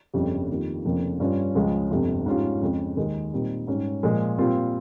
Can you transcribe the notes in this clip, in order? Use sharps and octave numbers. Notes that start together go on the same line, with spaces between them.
G1 F2 C#3 G3
F2 D#3 G3 A#3 F4
F1 F2 C#3 F3 A#3
G2 G3 C#4 F4
C#2 C#3 F3 G#3
G1 F2 C3
G#2 G3 C#4 F4
F2 C#3 G#3
D#2 D#3 G#3 D#4
A#2 G3 C4 D#4
G#2 G3 C#4
A#2 F3 G#3
A#2 G3 C4 F4